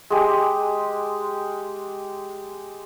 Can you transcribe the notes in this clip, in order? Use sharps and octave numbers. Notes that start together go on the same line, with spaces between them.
G#3 G4